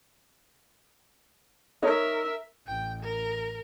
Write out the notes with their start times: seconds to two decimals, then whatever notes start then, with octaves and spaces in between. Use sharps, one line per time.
1.82 D#4 A#4 C#5 D#5 E5
2.67 A1 G5
3.02 A#4